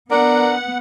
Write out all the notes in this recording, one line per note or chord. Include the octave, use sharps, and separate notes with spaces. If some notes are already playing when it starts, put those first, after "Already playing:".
B3 D4 A#4 F#5